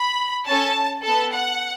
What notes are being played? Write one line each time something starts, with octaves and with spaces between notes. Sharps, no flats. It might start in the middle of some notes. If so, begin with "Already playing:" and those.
Already playing: B5
C#4 A4 A5
B3 A4 A5
F#5